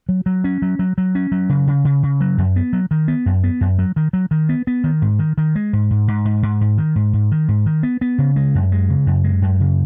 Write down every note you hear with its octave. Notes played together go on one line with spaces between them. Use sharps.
F#3
F#3
C#4
F#3
F#3
F#3
C#4
F#3
C#3
C#3
C#3
C#3
F#3
F#2
B3
F#3
D#3
B3
F#2
B3
F#2
F#3
D#3
F#3
D#3
B3
B3
D#3
G#2
D#3
D#3
G#3
G#2
G#2
G#2
G#2
G#2
G#2
D#3
G#2
G#2
D#3
G#2
D#3
B3
B3
C#3
G#3
F#2
G#3
C#3
F#2
G#3
F#2
C#3